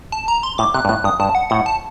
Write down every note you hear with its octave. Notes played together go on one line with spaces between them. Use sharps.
A5
A#5
C6
A2 D6
C3 F#6
G2
A2 F#6
G2 D#6
G2 A5
F#5
A2 F#5
A5